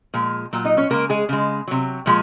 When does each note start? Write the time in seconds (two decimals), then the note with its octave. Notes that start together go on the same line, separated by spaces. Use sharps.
0.14 A#2 F3 G#3
0.53 A#2 F#3
0.65 D#4 D#5
0.77 C#4 C#5
0.90 C#3 G#3 A#3 A#4
1.10 G#3 G#4
1.29 C#3 G#3
1.68 C3 F#3
2.06 A#2 F3 G#3